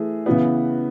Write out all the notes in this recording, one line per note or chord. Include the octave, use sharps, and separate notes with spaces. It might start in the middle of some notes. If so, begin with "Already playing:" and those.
Already playing: E3 A3 G#4
C#3 E3 B3